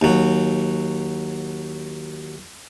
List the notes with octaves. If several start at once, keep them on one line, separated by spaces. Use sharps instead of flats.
D#2 F#3